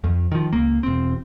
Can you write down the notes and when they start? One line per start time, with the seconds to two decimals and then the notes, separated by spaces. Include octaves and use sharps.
0.04 F2
0.32 D#3 F3
0.53 C#2 A#3
0.83 E1 C4